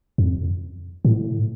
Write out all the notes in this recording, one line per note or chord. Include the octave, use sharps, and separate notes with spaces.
F2
A2